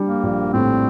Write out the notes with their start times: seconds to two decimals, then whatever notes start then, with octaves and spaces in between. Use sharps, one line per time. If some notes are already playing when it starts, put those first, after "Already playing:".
Already playing: G3 D4
0.08 A#3
0.23 A#1
0.53 A2 C4